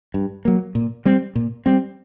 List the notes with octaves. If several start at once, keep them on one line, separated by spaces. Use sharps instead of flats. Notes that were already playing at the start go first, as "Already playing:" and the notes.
G2
F#3 A#3
A#2
G3 C4
A#2
G3 C4